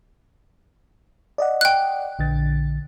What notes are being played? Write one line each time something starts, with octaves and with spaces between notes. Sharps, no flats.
D5 D#5 F#5
G5 F#6
A#1 D3 A6